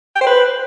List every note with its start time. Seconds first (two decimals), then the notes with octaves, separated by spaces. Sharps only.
0.16 G5
0.21 C5
0.27 B4